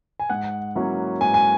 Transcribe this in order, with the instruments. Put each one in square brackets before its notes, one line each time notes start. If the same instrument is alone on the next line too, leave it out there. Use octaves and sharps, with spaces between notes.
[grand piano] G#5
G#2 F#5
F#3 A#3 C#4 E4
G#2 G#5
G#5